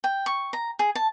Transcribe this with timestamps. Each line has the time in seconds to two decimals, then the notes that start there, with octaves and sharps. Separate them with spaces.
0.04 G5
0.26 C#6
0.53 A#5
0.79 G#4
0.95 A5